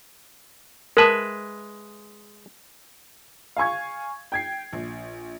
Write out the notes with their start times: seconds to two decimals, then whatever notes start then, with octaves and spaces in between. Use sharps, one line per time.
0.97 G#3 A#4 B4 E5 A5 D#6
3.57 F5 G#5 C#6 G#6
4.32 G5 G#6 C7
4.73 A#1